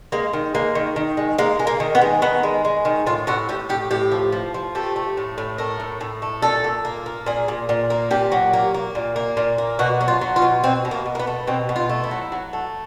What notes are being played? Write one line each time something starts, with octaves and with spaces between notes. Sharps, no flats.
G#3 A#3
D#3
G#3 A#3
D#3
D#3
G#3
G#3 A#3
G#3
A#3
D#3
B3
G#3
D#3 B3
G#3
G#3
D#3
A2 F4
A2 F#4
A2 G4
A2 G4
A2 G4
F3
F3
F3
A3 G4
A3
A2
A2
A3 A#4
A2
A2
A3
A#2 A4
A#2
A#3
A#3
A#2 G#4
A#2
A#2
A#3
A#2 G4
F#3
A#3
A#3
A#2
A#3
A#2
A#3
B2 F#4
F#3
F4
F#3
F4
B2
B2 C4
B2
A#3
B2
A#3
B3
A3
B2 C4
B2
F4
A3
E4
F#3
F#3
A3